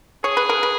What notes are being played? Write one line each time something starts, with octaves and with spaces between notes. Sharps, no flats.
G#4 C#5
B4
A#4
B4